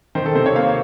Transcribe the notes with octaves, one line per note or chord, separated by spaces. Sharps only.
D#3 C5
A4
C3 C5
C#5
A#3 F5